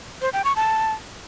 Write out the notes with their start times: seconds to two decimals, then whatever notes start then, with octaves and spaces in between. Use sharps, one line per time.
0.22 C5
0.33 G5
0.44 C#6
0.56 A5